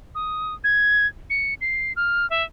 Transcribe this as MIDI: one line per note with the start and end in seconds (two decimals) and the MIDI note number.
0.15 0.54 87
0.64 1.07 92
1.30 1.54 97
1.61 1.93 96
1.96 2.28 89
2.30 2.43 76